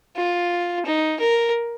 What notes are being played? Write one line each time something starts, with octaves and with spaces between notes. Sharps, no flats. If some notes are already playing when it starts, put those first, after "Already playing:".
F4
D#4
A#4